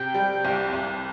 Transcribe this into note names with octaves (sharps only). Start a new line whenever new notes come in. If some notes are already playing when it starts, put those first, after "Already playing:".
Already playing: C3 G5
G3
C2
C2